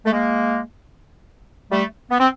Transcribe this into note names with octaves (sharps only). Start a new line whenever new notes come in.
A3
G#3 A#3
G3 A3
B3
C4